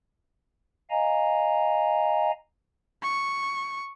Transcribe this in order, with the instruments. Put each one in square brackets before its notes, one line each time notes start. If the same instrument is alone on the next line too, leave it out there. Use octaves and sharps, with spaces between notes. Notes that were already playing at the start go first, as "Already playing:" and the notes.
[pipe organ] D#5 F5 G#5 A#5
[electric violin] C#6